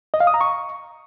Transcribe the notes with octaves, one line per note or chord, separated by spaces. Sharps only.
D#5
F5
D#6
A#5
C#6